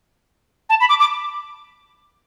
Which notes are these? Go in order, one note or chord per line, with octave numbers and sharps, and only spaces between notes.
A5
B5
D6
D6